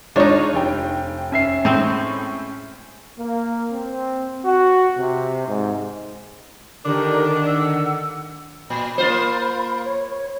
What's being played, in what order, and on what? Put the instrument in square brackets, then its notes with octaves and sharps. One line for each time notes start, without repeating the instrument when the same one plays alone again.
[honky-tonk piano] G#3 F4 C#5 [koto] D4 D#4
[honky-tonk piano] F1 G5
[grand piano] C#4 E5 C7
[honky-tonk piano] A2 G6 [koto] G#3 C4
[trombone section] A#3
C4
F#4
C3
G#2
[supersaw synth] D3 D#3 [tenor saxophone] D4 [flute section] G4 A#4 D5
[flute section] F#5 E6
[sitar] A#2 [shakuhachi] B5
[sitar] A#3 F4 C5
[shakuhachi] C#5